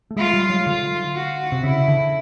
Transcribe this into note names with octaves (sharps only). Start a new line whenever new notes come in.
A3
G#3 F4
G3
F#3
D3 F4
F#4
C3
C#3 E4
D3